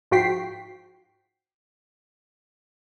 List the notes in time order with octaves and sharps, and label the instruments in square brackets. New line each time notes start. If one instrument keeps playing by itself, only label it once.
[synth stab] G#2 F3 F#4 G5 B6 C7